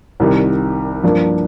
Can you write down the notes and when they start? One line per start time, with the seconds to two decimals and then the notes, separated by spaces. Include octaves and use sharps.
0.20 C2 C3 D#3 G3
1.03 G2 F3 A#3 D4